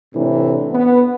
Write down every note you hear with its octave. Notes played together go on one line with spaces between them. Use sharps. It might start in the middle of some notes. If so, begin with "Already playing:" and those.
A2 C3 E3 D4
B3